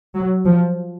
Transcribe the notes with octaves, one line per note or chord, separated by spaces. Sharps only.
F#3
F3